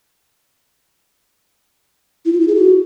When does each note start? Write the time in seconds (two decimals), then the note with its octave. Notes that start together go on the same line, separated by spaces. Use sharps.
2.25 E4
2.33 F4
2.40 E4
2.48 G#4
2.55 F#4